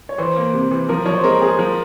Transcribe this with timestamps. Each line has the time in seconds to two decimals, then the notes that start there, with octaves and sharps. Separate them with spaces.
0.09 C#5
0.18 E3 C5
0.36 A#3
0.53 C3
0.71 E3
0.89 F3 A#4
1.06 F3 C#5
1.15 C5
1.24 G#3 A#4
1.42 G#3 G#4
1.58 F3 A#4